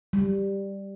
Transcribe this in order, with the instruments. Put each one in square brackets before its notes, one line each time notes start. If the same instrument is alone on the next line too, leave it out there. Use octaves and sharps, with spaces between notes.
[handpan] G3